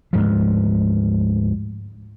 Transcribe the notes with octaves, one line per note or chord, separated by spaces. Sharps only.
D2 G#2 F3